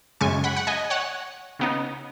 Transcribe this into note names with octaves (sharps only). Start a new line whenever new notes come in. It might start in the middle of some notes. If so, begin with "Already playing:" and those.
F#2 C#3 G#3 G#5 C#6
F#5 B5
F#5
D#5 G#5
C#5 F#5
C#3 B3 D#4